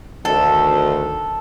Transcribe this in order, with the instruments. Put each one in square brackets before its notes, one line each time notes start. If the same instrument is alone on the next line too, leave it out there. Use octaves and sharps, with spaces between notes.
[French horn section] D2 D#3 [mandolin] A4